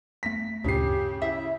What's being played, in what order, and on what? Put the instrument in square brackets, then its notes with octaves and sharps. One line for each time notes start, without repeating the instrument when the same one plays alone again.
[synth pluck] A3 A#6 [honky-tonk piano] B6
[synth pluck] D2 G2 A#2 [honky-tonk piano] C#3 C7 [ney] G4
[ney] E4 [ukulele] E5